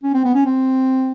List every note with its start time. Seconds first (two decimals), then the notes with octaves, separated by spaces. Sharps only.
0.03 C#4
0.14 C4
0.24 B3
0.35 C#4
0.46 C4